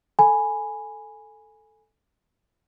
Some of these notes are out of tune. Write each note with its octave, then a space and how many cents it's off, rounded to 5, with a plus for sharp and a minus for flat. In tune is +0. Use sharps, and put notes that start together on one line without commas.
A4 +0 G#5 +0 B5 +0